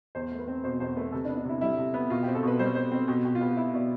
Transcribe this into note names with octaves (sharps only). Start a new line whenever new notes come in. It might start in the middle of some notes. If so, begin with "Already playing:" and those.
E2 C5
A3
B4
C4
B2 C5
E2 C5
A3 B4
C3 A4
D4
B3
D4
C3 E4
G3 E4
C3
B3
B2 F4
C4 G4
A4
B2 B4
G3 C5
B2 C5
C4
B2 G4
B2 G4
F4
B3 G4
B3 E4
B2 D5